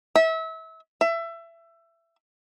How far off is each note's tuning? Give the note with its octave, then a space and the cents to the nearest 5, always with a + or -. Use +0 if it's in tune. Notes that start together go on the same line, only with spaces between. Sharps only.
E5 -30
E5 +20